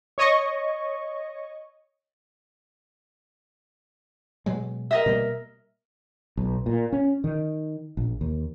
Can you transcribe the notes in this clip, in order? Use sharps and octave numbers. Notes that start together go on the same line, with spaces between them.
C#5 D#5 C#6
B2 F#3 G#3
A#4 D#5 E5
B2 G3 A#3
B1
A#2
C#4
D#3
A#1
D#2